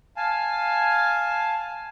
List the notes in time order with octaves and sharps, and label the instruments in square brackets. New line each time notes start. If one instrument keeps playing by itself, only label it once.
[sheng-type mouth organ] F5 G#5 A5